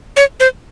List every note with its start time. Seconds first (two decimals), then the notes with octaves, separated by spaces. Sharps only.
0.17 C#5
0.40 C5